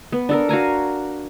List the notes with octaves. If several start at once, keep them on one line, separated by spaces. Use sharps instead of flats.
B3
D4 A4 A#4
F#4 F5 G#5 A#5